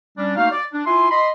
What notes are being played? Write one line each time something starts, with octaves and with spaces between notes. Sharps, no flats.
G3 C#4 D4
A3 A#3 D#4 F#4 C5 F5
D5
D4
E4 F4 E5 G#5 C6
D#5 B5 C6